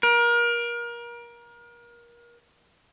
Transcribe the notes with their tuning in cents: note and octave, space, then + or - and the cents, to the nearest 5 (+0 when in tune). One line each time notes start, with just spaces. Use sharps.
A#4 +30